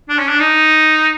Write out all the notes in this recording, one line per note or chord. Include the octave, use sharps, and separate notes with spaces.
D4
C#4
D4
D#4